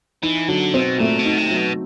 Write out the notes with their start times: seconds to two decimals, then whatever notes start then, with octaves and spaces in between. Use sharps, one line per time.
0.23 E3 D#4
0.48 D3 F#3
0.74 B2 C4
0.99 A#2 A3
1.19 B2
1.25 D#4
1.38 C3
1.50 F#3
1.57 B2